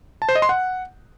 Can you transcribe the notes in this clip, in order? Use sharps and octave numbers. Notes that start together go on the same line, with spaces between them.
A5
C5
D#5
C6
F#5